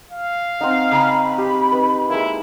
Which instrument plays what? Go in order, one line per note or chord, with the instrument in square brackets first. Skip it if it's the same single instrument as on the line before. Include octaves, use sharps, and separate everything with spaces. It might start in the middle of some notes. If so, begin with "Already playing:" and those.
[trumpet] F5
[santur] C4 D#4 [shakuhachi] F#5
[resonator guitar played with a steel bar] C#3 A#5 [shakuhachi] B5
[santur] G4
D#4 B4
[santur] G#3 A#3 [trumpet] E4